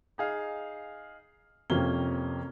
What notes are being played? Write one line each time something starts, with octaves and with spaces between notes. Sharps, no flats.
D#4 G#4 F5
F2 C3 A#3 C#4 G7